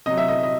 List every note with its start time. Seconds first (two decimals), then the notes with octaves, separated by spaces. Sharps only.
0.06 C3 F#3 D#5
0.17 E5
0.28 D#5
0.43 D#5